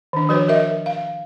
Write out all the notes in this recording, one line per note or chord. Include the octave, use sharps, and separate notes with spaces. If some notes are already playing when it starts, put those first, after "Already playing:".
D#3 D4
F3 F#4 B4 C#5
F#4 A#4 D#5 E5
F5